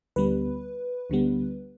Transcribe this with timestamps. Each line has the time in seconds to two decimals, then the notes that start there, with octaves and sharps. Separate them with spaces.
0.16 D2 D3 G3 B3 B4
1.10 D2 D3 G3 B3